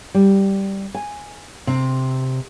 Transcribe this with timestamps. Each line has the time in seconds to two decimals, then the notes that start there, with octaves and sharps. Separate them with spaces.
0.14 G3
0.94 G#5
1.67 C3